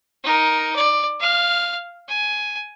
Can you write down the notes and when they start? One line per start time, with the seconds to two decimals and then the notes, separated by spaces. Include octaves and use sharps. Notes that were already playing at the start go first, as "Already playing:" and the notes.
0.24 D#4 A#4
0.76 D5
1.20 F5 F6
2.09 G#5